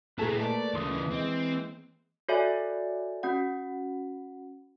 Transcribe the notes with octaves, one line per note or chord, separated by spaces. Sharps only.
A#2 A3 E4 G#4 B4 A5 A#5
A3 A#3 D5
D2 C#3 E3 C6 D#6
G#3 C4
F#4 A4 C#5 D5 E5 G#5
C#4 F#4 F#5